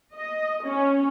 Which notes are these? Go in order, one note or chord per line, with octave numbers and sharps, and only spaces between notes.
D#5
C#4